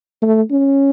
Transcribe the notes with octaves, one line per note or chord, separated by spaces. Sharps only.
A3
C#4